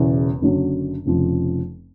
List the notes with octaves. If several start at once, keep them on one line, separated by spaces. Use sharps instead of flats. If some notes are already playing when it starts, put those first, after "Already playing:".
Already playing: E1 E2 C#3 E3
F#1 F#2 D3 F#3
F1 F2 C#3 F3